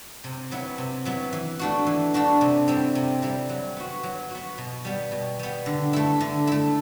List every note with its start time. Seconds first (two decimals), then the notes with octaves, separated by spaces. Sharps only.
0.24 C3
0.51 F#3 B3 E4
0.78 C3
1.05 F#3 B3 E4
1.33 E3
1.59 A3 D4 F#4
1.87 E3
2.14 A3 D4 F#4
2.41 C3
2.68 G3 C4 E4
2.95 C3
3.22 G3 C4 E4
3.49 F#3
3.77 B3 F#4
4.03 F#3
4.31 B3 F#4
4.58 B2
4.85 G3 B3
5.12 B2
5.39 G3 B3
5.66 D3
5.93 A3 E4
6.21 D3
6.47 A3 E4